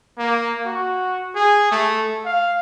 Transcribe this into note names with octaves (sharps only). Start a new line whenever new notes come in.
A#3
F#4
G#4
A3
F5